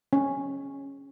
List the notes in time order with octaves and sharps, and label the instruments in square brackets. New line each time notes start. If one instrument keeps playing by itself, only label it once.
[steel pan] C#4